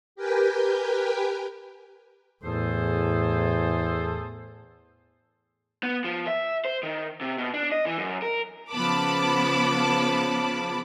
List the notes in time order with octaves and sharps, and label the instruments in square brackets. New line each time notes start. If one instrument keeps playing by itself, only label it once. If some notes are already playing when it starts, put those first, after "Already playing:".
[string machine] G4 A#4 B4 G5 G#5
[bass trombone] E2 [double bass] A2 [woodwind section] G#4 A4 C5
[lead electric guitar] B3
F3
E5
C5
D#3
C3
B2
D4
D#5
E3
F#2
A#4
[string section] C#3 F3 B3 A5 B5 D6